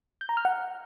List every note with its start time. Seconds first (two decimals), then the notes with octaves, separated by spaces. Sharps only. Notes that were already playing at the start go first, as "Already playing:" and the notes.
0.21 G6
0.29 A#5
0.37 F6
0.45 F#5